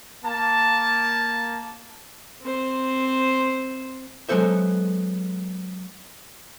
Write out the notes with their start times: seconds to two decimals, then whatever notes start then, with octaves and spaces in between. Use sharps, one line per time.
0.24 A#3 A5
2.41 C4 C5
4.29 F#3 G#3 B3 A4 C5 E5